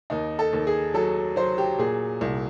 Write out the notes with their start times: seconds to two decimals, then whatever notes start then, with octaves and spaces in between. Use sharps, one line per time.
0.10 D#2 D#4
0.39 A4
0.53 D#2
0.67 G#4
0.94 F#3 A4
1.36 F#3 C5
1.58 G4
1.78 A#2 G#4
2.21 C2